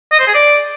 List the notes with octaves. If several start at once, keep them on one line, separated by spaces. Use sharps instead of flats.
D#5
C5
G#4
D5